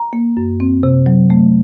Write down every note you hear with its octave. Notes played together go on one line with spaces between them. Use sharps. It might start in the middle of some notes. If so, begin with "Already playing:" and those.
Already playing: A#5
A#3
F#2
C4
C3
F#3
A3